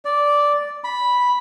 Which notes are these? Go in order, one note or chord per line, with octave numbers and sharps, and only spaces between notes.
D5
B5